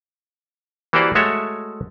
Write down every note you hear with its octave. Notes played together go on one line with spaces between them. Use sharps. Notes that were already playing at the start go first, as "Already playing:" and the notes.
E3 A#3 F#4 G4 C5 D5
G#3 A3 F#4 A4 C#5 E5